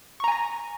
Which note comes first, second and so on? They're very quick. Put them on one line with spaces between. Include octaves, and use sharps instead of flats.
C#6 A#5 G#5 A#6